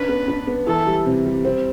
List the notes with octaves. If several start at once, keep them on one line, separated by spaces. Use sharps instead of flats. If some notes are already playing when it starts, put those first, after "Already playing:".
Already playing: C#4 D4 B4
B3
D4
B3
E3 A4
G3
C3
G3
C4